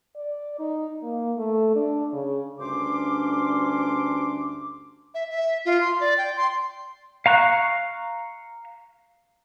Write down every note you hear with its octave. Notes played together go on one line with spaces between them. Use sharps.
D5
D#4
A#3
A3
D4
C#3
D2 G2 C#4 D4 C6 D6
E5
E5
F4
C6
D5
G5
C6
F5 A#5 C#6 F#6